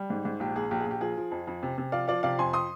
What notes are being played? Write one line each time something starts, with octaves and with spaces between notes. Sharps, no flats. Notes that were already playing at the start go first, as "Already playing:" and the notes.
Already playing: G3
G#2
G#2
A#1 G4
A#1 G#4
A#1 G4
G#4
A#1
G4
F3 G#4
F3
F2
F2
C3
C3
F3 D5 F5
F3 D5 F5
C3 D5 F5
F2 G#5 C6
C6 D#6